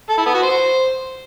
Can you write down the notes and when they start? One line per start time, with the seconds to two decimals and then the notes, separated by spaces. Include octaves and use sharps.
0.10 A4
0.18 E4
0.26 B3
0.34 F#4
0.42 C5